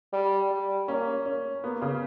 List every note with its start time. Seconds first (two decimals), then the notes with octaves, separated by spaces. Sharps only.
0.13 G3
0.51 G3
0.88 A#3 C#4
1.26 C#4
1.64 A#3 B3
1.82 C#3